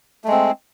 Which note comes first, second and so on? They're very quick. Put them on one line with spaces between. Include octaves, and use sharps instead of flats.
A3 G#3 C4